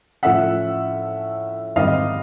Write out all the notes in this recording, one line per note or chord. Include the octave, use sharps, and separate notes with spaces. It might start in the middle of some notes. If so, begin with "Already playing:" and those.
A2 F3 A3 C#4 E5 F#5
G#2 D#3 G3 C4 D#5 F5